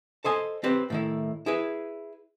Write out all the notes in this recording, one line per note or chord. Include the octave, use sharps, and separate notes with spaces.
A4 C5 D#5 G#5
C4 G4 B4 C5
A2 D#3 E4
E4 G#4 B4